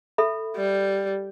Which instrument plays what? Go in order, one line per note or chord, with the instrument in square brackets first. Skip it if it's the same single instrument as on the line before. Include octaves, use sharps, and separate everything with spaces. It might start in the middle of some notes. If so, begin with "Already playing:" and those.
[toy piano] A4 E5 B5
[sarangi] G3